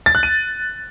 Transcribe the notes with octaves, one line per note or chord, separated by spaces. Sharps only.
A6
F#6
D#7